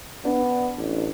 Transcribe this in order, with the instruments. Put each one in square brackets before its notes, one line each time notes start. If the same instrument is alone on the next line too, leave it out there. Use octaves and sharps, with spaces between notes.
[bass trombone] B3 [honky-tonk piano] D4
[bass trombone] A1